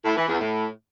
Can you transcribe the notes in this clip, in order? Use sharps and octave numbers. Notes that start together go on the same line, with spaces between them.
A2
E3
E2
A2